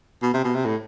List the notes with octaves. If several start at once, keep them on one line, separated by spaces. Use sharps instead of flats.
B2
C3
B2
C3
A2